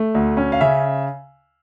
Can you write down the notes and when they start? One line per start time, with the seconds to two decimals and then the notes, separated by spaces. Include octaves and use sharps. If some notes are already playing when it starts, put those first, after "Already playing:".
Already playing: A3
0.15 D2
0.37 C#4
0.52 F5
0.61 C#3 E5